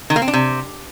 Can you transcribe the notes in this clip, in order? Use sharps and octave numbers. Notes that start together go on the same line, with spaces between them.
D#3
A#3
C4
D4
C3